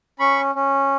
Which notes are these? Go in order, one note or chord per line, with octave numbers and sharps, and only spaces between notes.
C#4 B5 C#6
C#4